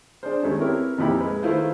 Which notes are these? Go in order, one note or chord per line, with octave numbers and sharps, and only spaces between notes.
D4 G#4 C5
D#2 G#3 A3 C#4
C4 E4 G4 A#4 B4 C#5
F2 A#2 D#4 E4 G4 B5
G#3 B4
D#3 A3 E4 F4 B4 C5